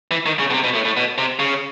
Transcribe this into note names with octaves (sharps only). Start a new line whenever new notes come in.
E3
D#3
C#3
B2
C3
B2
A2
A2
B2
C3
C#3